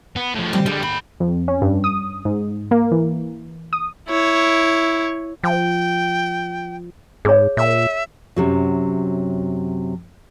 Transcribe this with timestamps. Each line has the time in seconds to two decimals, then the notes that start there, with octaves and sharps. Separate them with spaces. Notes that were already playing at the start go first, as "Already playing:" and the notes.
0.16 B3
0.35 A2 F3
0.53 G3 C4 G4
0.66 D3 G3 G#3
0.83 D#2 G#4 B5
1.20 F2
1.48 C#4
1.62 G2
1.84 D#6
2.25 G#2
2.71 A#3
2.92 E3
3.73 D#6
4.08 E4 C#5
5.44 F3 G5
7.25 G#2 G#4 C#5
7.57 A#2 E5
8.36 F#2 C3 F#3